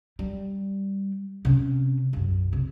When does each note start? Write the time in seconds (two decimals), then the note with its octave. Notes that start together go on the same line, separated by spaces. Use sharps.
0.19 G3
1.45 C3 C#4
2.13 B1 F#2
2.53 C3